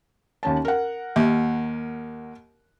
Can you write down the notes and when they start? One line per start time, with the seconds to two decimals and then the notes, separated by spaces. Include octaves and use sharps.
0.43 D#2 C#4 A5
0.65 A#4 F#5
1.16 D#2